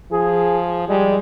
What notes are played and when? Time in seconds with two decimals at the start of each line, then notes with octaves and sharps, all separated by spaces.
0.12 F3 G#4
0.89 G3 G#3